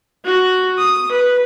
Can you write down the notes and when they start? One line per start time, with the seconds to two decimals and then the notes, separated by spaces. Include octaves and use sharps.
0.25 F#4
0.78 D#6
1.11 B4